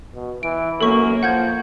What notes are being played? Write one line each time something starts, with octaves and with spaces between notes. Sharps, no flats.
B2
E3 D7
F#2 A#3 A4 C#6
F3 F#5 G6 G#6